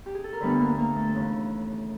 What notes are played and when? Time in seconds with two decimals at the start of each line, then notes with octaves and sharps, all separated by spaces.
0.06 G4
0.15 G#4
0.24 A4
0.33 A#4
0.40 D2 D3 G3 B3 B4
0.60 A#3 A#4
0.78 A#3 A#4
0.96 A3 A4
1.14 D#2 C#3 E3